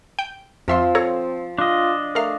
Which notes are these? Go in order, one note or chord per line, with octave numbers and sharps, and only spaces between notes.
G5
F2 F3 C4 E5 C6
A4 C#5 A#5
D4 F4 D#5
A3 A#4 F5